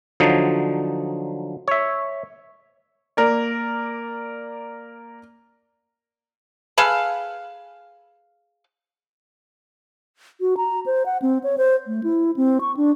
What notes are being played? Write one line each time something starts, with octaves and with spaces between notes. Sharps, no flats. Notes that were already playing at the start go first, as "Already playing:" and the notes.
D3 F3 F#3 D#4
C#5 E5
A#3 A#4 D5
G#4 A4 B4 F5
F#4
A#5
C5
F#5
C4
C#5
C5
A3
E4
C4
C#6
D4